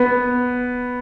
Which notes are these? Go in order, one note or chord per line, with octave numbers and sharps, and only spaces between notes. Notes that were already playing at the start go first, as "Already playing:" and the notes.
Already playing: B3